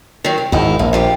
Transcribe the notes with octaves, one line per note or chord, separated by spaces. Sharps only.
D#3 F#3
C3
G#1 E2 D#4 E4
A#1 A#3
C3 F4 G4